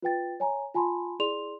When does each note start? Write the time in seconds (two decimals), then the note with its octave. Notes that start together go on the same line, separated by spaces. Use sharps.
0.02 F4 B4 G5 A6
0.40 C#5 G#5 A#5
0.74 F4 G#5 A5 B5 C6
1.19 E4 G#4 D5 C6 F7